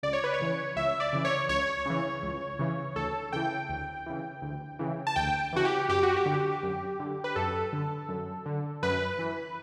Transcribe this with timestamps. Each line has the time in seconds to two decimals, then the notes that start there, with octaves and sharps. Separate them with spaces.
0.03 C#2 D5
0.13 C#5
0.24 B4
0.34 C#5
0.40 C#3 E3
0.76 C#2 E5
1.00 D5
1.13 C#3 E3
1.25 C#5
1.49 C#2 C#5
1.86 C#3 E3
2.23 C#2
2.59 C#3 E3
2.96 D2 A4
3.33 C#3 E3 G5
3.69 D2
4.06 C#3 E3
4.42 D2
4.79 C#3 E3
5.07 A5
5.16 D2 G5
5.53 C#3 E3 F#4
5.65 G4
5.89 F#2 G4
6.03 F#4
6.16 G4
6.26 D3
6.63 F#2
7.00 D3
7.24 B4
7.36 F#2 A4
7.73 D3
8.09 F#2
8.46 D3
8.83 F#2 B4
9.19 E3